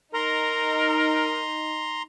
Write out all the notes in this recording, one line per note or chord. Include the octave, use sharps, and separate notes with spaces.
D#4 A#4 A#5 C6